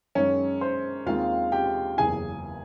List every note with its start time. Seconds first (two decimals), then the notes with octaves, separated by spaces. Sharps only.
0.15 F#2 D#3 G#3 C#4 C#5
0.61 C5
1.06 D#2 D#3 G#3 C4 F4 F5
1.52 G4 G5
1.97 F#1 E2 C#3 E3 G#4 G#5